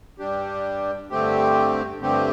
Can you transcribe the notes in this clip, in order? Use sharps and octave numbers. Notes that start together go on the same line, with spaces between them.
G2 G3 D4 G4
G2 D3 A3 C4 G4
G2 D3 A3 C4 G4